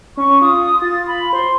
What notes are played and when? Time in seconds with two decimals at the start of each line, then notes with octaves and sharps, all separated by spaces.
0.17 C#4 C#6
0.42 F4 D#6
0.82 F4 A6
1.07 B5
1.33 C5 C6